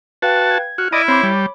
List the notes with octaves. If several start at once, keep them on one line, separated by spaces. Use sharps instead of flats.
F#4 B4 F5 G5 A5
G#6
F#4 F6
E4 D5 D#5 B5
C4 C#5 B5 D6
G3